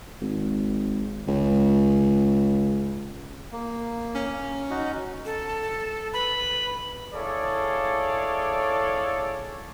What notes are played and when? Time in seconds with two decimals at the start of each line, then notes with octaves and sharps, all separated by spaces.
0.21 G#1
1.28 C#2
3.53 A#3
4.15 C#4
4.71 D#4 F#4
5.25 A4
6.14 B4 B5
7.14 E4 G#4 A4 C#5 D5 F5